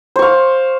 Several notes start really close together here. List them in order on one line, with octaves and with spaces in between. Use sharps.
C5 C#6 F5